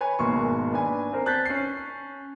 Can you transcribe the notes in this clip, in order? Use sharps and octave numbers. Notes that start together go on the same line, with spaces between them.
B4 C#5 G#5 B5
G#1 B2 A#3 C6 C#6
D4 B4 G#5
C4 A#4 C5
A5 F#6 G6 A6 B6
C#4 C7